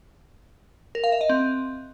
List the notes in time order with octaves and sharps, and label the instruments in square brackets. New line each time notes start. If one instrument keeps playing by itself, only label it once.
[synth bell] A#4
F5
E5
D#5
C4